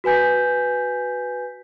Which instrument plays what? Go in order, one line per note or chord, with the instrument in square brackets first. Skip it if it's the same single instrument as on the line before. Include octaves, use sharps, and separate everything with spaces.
[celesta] F#4 B4 G#5 G6 B6